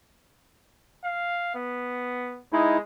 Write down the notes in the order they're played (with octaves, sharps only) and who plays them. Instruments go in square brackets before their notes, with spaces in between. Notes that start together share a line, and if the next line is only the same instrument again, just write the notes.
[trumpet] F5
B3
[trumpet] G#3 [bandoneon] D#4 E4